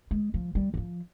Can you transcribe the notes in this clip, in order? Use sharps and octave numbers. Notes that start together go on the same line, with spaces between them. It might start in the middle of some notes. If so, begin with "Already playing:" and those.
G#3
F3
G3
E3
F3